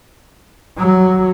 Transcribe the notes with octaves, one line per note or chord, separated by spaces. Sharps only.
F#3